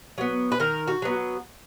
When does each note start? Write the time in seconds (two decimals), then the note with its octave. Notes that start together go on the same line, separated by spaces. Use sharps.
0.18 F#3 B3
0.52 B4
0.60 D#3 A#4
0.88 F#4
1.02 F#3 B3